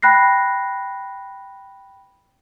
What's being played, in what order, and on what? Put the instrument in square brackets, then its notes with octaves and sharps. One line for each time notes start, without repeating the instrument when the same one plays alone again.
[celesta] G5 B5 F#6 A#6 C7